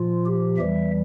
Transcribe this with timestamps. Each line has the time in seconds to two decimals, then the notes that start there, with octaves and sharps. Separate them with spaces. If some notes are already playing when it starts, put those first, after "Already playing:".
Already playing: A#2 F3 F4
0.26 G4
0.57 E2 E3 G3 E5